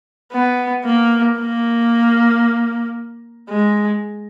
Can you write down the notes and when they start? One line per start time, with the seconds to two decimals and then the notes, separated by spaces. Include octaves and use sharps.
0.33 B3
0.85 A#3
1.39 A#3
3.49 G#3